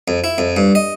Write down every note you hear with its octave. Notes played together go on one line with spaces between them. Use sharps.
F2
E4
F2
G2
D#5